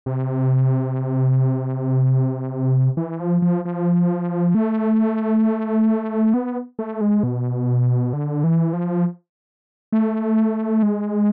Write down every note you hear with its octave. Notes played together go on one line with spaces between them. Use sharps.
C3
E3
F3
F3
F3
A3
B3
A3
G#3
B2
D3
E3
F3
A3
G#3